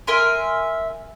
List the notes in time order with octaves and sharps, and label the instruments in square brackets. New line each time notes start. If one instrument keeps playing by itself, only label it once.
[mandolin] A#4 E5 G#5 C6